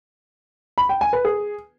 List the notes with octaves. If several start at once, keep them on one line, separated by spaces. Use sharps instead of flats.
B5
G5
G#5
B4
G#4